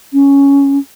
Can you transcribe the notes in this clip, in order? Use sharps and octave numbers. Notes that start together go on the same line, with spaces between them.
C#4